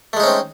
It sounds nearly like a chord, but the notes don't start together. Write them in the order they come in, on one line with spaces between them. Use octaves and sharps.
A3 G#3 D#4 C#4 C4